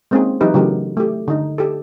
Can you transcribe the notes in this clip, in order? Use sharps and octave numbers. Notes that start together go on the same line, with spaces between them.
G#3 A#3 C4 C#4 D#4 G#4
E3 F#3 D#4 E4 G4 B4
C#3 E3 F#3 A3 G4 A#4
A3 G4
D3 D#4
G4 A4